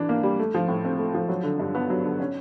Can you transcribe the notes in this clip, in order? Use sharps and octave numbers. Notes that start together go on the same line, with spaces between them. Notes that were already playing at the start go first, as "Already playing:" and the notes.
Already playing: E3 D4
A#3
G3
A3
F3
A2
C4
A3
F3
F#3
D3
G2
B3
F#3
D3
C#4